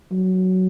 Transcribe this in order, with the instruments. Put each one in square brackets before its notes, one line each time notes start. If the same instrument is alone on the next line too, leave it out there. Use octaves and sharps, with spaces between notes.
[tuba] F#3